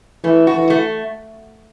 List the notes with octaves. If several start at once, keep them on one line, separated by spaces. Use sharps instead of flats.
E3 A3
F#4
E3
A3